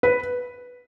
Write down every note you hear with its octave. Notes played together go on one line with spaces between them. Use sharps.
B4